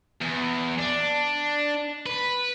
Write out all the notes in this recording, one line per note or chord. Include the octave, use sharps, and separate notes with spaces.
E2
D4
B4